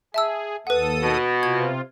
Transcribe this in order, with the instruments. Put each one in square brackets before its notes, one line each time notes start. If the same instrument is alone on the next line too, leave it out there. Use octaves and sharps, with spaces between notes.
[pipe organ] G#4 [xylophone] E5 A5 E6
[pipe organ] D#2 A4 D#6 [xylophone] B4 F#5
[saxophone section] B2
[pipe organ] C3 F4 [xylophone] G#6